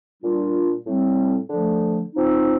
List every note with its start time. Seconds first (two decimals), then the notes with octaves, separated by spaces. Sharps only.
0.23 A#2 G3 D4 F4
0.87 A2 G3 C4
1.50 D3 F3 A3
2.14 F3 C4 D#4